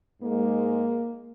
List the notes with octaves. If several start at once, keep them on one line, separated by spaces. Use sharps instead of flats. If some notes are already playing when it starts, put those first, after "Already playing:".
G#2 G#3 A#3